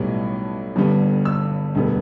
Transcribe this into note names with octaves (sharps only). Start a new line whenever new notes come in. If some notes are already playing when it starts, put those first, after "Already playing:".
Already playing: B1 A2 G3 B3
G1 G2 D3 G3 B3
E6
E1 D2 D3 G3 B3